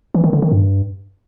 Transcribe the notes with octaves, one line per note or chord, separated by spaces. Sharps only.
E3
D#3
D3
D#3
G2